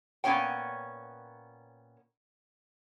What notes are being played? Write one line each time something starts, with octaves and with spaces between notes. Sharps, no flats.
A#2 B3 C#4 C#5 G5